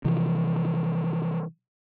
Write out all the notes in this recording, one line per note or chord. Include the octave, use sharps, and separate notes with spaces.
C3 E3 F3